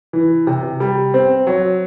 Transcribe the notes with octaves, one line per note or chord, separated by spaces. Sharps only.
E3
C3
G3
C4
F#3